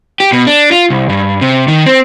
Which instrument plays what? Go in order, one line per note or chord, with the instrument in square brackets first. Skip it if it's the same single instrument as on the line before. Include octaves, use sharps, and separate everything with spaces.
[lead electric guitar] G4
B2
D4
F4
C2
G2
C3
D#3
C4